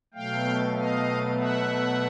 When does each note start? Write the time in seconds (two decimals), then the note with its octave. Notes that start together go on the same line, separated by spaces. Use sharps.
0.14 B2 F#3 A3 F5 G5
0.76 D#5 F5
1.38 E5 F#5